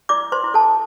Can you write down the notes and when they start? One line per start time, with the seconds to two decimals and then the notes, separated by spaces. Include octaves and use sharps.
0.09 E4 D5 D6
0.32 C5 C6
0.44 E4
0.54 A4 A5